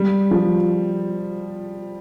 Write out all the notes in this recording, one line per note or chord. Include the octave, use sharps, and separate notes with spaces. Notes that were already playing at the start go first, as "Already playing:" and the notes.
Already playing: G3
F3